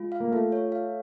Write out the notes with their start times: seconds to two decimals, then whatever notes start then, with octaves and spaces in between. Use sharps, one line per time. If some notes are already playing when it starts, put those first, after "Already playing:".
Already playing: G#3 F4
0.12 F5
0.20 A#3
0.32 A3 F4
0.52 C#5
0.72 F5